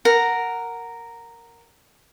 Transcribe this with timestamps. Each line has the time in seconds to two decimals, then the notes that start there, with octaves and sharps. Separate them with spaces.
0.05 A#4 F#5